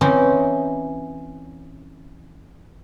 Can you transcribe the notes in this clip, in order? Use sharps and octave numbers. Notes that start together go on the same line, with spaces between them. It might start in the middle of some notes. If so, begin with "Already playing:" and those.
E3 C4 C#4 D#4